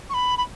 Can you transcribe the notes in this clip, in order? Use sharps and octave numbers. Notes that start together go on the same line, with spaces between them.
C#6
B5
B5